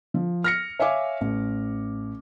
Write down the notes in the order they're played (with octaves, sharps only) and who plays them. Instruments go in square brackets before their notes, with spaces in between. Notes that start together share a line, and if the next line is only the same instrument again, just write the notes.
[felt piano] F3
F6 A#6 C#7
C#5 E5 F5 G#5 D6
A1